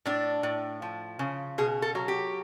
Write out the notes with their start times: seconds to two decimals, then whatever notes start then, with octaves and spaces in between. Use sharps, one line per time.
0.06 A2 D4
0.43 A2
0.82 F3
1.19 C#3
1.58 B2 G#4
1.82 A4
1.95 F#3
2.08 G4